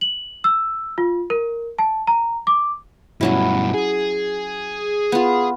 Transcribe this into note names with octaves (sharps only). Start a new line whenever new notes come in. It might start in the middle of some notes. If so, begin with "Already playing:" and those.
F#7
E6
F4
A#4
A5
A#5
D6
G2 B2 F#3 C#4 E4
G#4
B3 F4